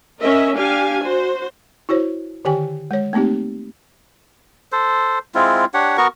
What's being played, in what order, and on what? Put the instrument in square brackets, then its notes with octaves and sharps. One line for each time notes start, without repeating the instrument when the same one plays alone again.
[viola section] C#4 A#4 D#5 E5
D4 G4 F5 G#5
F#4 C5
[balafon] E4 F#4 C5 C#5
D3 D#3 G4 G5 G#5
G#3 C#5
A3 A#3 C4 D#4 G4
[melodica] A4 C5
G#3 C4 E4 F4
D4 G4 C#5 F#5
B3 F#4 A#4 C#6